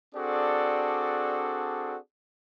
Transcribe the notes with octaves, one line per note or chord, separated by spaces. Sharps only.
C4 D4 F#4 G#4 A4 D5